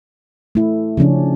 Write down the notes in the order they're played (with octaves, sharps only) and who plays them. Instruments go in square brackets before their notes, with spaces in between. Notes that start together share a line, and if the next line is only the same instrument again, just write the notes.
[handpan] A3 E4
C#3 F3 C#4 D4